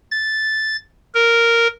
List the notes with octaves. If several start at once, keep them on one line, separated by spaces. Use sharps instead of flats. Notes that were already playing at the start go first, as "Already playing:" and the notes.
A6
A#4